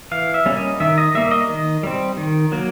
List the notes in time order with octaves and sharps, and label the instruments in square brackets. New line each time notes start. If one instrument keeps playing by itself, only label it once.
[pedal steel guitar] E3 F5
E5
G3 A#3 C#4
D#5
D#3 E5
D#5
G3 A#3 E5
D#5
D#3
G3 C4
D#3
F#3 A#3